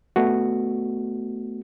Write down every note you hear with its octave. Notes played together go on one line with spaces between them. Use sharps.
A3 B3 F#4